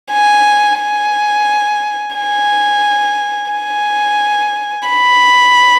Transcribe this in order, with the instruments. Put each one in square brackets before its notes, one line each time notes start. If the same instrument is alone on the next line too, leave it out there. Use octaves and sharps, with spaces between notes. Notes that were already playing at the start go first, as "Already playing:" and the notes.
[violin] G#5
G#5
G#5
G#5
B5